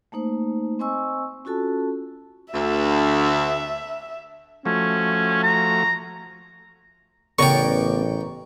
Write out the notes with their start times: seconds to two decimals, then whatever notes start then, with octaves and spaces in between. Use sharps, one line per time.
0.12 A3 A#3 D#4 C5
0.79 C4 C5 D#5 G#5 C#6 E6
1.45 C#4 F4 F#4 A4 A5
2.53 D2 E5
4.65 F3 A3 C#4 F#4
5.43 A#5
7.39 A1 C#3 B3 A#4 C#5 D5 G5 C#6